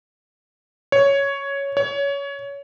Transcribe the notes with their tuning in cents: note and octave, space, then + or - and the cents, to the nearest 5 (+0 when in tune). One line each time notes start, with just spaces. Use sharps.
C#5 +5
C#5 +20